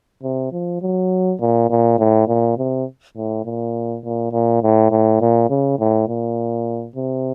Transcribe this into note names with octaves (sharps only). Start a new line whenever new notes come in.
C3
F3
F#3
A#2
A#2
A2
A#2
C3
A2
A#2
A#2
A#2
A2
A2
A#2
C#3
A2
A#2
C3